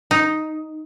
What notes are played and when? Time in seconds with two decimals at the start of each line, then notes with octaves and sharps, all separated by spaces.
0.11 D#4